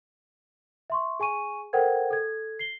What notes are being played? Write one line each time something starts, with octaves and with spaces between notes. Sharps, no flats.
E5 C6 C#6
G#4 G#5 C#6 D#7
A4 A#4 C5 F#5 G5 G#6
A4 G#6
C7 G7